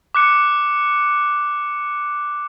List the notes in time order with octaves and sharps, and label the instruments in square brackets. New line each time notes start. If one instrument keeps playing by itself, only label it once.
[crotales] D6 F#6 C#7